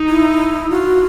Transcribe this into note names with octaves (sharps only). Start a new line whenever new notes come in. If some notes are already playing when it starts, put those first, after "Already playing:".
Already playing: D#4
E4
F4 F#4